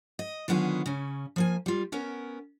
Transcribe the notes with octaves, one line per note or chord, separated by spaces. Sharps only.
D#5
D3 D#3 F#3 B3 F4 G#4
C#3 C#4
F3 A#3 G#5
G3 F4
B3 C#4 A#4